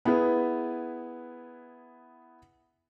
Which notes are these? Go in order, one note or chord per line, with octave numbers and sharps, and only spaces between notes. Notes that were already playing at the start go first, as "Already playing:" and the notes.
B3 E4 G#4 B4